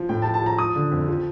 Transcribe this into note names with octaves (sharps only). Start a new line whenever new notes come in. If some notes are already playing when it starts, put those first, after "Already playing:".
Already playing: F3
A2 G5
A5
F3
A5
F3 A#5
F3 D#6
D3
F2
F3